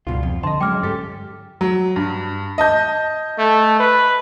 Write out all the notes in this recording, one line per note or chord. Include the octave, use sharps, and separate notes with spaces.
C#2 G2 B2 F4
F2
D3 D#5 A5 C6
F#3 G#3 C#4 G5 D6 F6
G2 G4 A4
F#3
G2
D#5 A5 G6
A3
B4